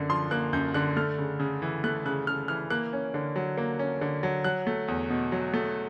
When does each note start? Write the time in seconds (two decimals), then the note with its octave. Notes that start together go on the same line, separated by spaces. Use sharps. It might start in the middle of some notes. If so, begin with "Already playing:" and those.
Already playing: F#2 D3 A#3
0.09 F3 C6
0.31 A#3 F#6
0.53 F#2 G6
0.74 D3 F#6
0.97 A3 F6
1.18 C#3
1.40 C#3
1.62 E3
1.84 A3 F#6
2.05 C#3 F#6
2.27 C#3 F6
2.48 E3 F6
2.70 A#3 F#6
2.93 C#4
3.14 D3
3.36 F#3
3.58 A#3
3.79 C#4
4.01 D3
4.23 F#3
4.44 F#3 F#6
4.67 A3
4.88 E2
5.10 B2
5.32 F#3
5.54 A3